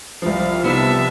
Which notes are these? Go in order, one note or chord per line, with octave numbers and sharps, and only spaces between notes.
C2 F3 F5
C3 B3 D#4 E5 A5